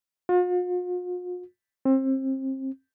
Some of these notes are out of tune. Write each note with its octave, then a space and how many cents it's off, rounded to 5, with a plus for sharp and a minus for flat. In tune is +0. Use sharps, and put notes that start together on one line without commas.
F4 +45
C4 +30